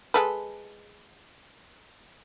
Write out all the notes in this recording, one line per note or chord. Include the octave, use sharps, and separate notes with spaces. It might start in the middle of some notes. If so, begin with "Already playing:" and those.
G#3 A4 B4